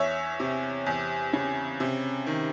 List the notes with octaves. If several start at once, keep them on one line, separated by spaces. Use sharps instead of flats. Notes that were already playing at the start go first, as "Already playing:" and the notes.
Already playing: E2 C#5 E5
C3
E2
C#3
C3
D#3